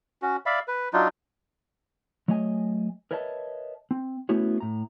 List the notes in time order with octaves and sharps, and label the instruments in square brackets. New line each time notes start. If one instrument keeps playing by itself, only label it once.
[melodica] C#4 F#4
D5 E5 F5 B5
B4
F#3 D4 D#4 F4
[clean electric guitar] F#3 A3 C#5 D#5 G#5
A#4 B4 C#5 D#5 E5 A5
C4
A3 B3 C#4 E4 F#4 C#5
A2 A#5